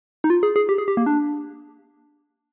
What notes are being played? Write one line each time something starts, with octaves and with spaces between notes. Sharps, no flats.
D#4
F4
G#4
G#4
G4
G#4
G4
A#3
D4